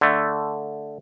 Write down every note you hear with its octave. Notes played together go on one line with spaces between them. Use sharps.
D3 A3